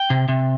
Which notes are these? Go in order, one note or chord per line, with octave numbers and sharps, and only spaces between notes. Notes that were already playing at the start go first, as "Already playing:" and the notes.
Already playing: G5
C3
C3